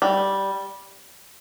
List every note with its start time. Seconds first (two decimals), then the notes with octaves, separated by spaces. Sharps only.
0.02 G3